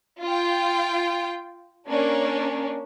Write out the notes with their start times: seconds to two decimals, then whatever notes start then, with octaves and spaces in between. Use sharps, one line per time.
0.21 F4 G5
1.88 A#3 C#4 D4